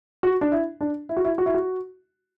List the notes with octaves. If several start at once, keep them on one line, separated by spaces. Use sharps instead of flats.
F#4
D4
E4
D4
E4
F#4
E4
F#4
E4
F#4